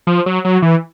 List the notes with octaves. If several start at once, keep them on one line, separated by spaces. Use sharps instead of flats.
F3
F#3
F#3
E3